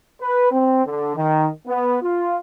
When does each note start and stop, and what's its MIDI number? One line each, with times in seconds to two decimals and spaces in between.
0.21 0.51 71
0.51 0.85 60
0.85 1.16 50
1.17 1.48 51
1.66 1.98 59
2.02 2.38 65